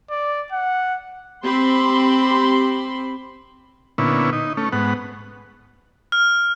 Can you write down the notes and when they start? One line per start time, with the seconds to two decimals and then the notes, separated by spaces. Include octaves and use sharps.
0.10 D5
0.52 F#5
1.43 C4 G4 B5 C6
3.98 A#2 D3 B3 C#4 E4
4.33 D#4
4.57 A3 C#4
4.72 G#2 B3 F#5
6.12 F6